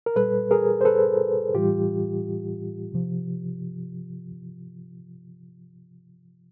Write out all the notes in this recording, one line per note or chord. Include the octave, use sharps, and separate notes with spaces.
A#4
A#2 G3 A4 B4
G#4 A#4
C5
A4 B4
A2 E3 G3 F4 G4
C3 F3